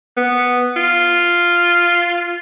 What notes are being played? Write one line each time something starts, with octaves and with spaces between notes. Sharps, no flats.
B3
F4